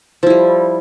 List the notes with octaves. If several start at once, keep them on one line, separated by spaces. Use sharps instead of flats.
F3 G3 E4